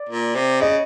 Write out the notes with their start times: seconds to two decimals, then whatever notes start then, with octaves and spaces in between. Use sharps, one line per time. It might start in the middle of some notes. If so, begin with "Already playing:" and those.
Already playing: D5
0.09 A#2
0.35 C3
0.61 C#3 D#5